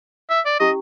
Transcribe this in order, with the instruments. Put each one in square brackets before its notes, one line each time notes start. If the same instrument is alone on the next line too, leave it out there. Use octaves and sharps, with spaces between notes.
[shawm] E5
D5
[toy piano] C#4 E4 G4 [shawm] D#5